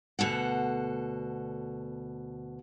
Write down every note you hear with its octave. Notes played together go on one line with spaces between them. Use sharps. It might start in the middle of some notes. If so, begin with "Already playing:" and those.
D2 B2 A4 F#5